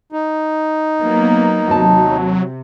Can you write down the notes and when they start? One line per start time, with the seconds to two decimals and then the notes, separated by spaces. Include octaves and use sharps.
0.12 D#4
1.02 F#3 A#3 B3
1.67 D#2 C3 F#3 A5